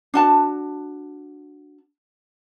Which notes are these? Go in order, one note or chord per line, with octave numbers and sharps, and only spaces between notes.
D4 F#4 A5